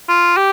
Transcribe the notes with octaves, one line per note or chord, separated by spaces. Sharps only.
F4
G4